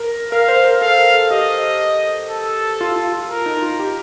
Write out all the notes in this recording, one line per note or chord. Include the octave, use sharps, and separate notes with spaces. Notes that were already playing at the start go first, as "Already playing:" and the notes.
Already playing: A#4
A#4 F5
C5
A#4
A4 F5
A#4
A4
G4 D#5
A4
F4
F4
F4
A#4
D#4
F4
G4